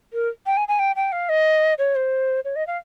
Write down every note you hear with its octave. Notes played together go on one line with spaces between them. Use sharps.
A#4
G5
G#5
G#5
G5
G5
F5
D#5
C#5
C5
C#5
D#5
F5